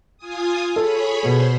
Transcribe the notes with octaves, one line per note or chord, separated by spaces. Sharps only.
F4 G#5 D#6
G#4 A4 C#5 B5
B2 C5 C6